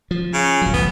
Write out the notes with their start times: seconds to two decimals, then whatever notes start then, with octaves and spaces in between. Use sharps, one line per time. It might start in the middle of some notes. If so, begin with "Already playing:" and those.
0.11 F3
0.34 C#3
0.62 D#1 F#3
0.74 A1 E2 A2 B3